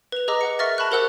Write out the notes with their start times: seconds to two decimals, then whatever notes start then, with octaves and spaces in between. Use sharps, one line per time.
0.12 B4 F7
0.28 G#4 B4 D#5 A#5 D6 E6
0.41 B4 F#5 C#7
0.59 A#4 E5 C#6 F6 A6 A#6
0.78 A5 B5 C#6 F#6
0.91 G4 A#4 C5 F#5 E6 F#6